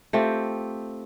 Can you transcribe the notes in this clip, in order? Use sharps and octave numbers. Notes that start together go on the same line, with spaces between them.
A3 C4 F4 G4